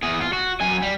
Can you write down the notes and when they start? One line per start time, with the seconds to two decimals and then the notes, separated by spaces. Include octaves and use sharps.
0.03 E2 G#4
0.21 F4
0.33 F#4
0.60 F#2 G#5
0.82 G3